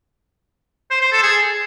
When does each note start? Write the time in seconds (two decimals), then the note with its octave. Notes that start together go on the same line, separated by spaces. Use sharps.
0.90 C5
1.01 C5
1.12 A4
1.23 G#4